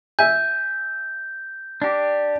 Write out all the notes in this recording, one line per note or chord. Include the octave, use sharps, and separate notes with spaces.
E5 G#5 G6
D4 G4